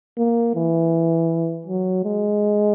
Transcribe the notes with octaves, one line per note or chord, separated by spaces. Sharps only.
A#3
E3
F#3
G#3